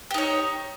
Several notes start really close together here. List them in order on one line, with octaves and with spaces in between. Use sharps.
G4 D#4 C#5